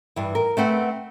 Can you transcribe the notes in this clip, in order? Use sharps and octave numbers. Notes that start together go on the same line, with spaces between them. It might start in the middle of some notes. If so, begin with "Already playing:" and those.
G2 E3
A#4
A3 C4 B4 F#5